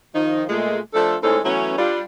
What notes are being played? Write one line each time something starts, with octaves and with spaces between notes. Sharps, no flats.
D#3 F3 D#4
A#2 G#3 A3
F3 A3 D4 F4 A4
A2 G#3 C4 C#4 D#4 A4
E3 F#3 A3 B3 C#4
G3 D4 F4